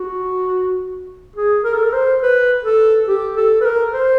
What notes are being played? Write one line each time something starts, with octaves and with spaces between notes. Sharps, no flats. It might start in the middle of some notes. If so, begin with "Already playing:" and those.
Already playing: F#4
G#4
A#4
A4
A#4
C5
B4
A4
G4
A4
B4
A#4
C5